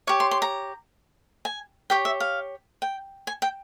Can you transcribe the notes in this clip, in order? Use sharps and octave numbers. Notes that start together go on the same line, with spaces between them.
G4 C#5 C#6
C6
C6
A#5
G#5
G4 C#5 G5
E5
F5
G5
G#5
G5